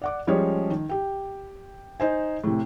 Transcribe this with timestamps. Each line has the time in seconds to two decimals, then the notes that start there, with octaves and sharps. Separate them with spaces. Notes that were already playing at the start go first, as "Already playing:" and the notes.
0.02 D5 F#5 D6
0.27 F3 G3 G#3 C#4 G#4 C#5
0.70 D#3
0.89 G4 G5
2.00 D#4 C5 G#5
2.44 A2 C3